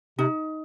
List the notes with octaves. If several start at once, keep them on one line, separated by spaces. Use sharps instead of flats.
C3 D#4